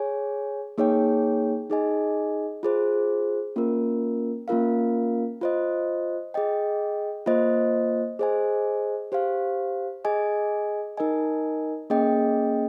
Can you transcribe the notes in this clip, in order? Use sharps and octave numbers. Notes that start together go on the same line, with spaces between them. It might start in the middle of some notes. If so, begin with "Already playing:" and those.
Already playing: G#4 C#5 G#5
A#3 D#4 G#4 C#5 G5
D#4 G#4 D#5 G#5
F4 G#4 C5
A#3 C#4 F4 A#4
A#3 C#4 F4 A#4 F5
F4 C5 D#5
G#4 D#5 G5
A#3 F4 C5 D#5
G#4 C5 D#5 G#5
G4 C5 F5
G#4 D#5 G#5
D#4 A#4 D#5 G#5
A#3 C#4 G#4 D#5 G5